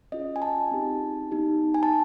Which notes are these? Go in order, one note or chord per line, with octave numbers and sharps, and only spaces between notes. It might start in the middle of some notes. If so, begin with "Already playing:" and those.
C#4 F4 G#4 D#5
G#5
A5
C4 D#4 G4
B3 D#4 G4
G#5
A5